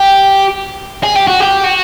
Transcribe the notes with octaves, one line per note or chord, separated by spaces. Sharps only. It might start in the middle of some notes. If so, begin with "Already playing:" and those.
Already playing: G4
G#4
G4
F#4
G4
F#4